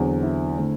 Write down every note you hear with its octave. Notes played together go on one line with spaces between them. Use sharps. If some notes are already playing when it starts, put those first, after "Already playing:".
Already playing: E2 D3 F#3 C4
E4
D3 A3 C4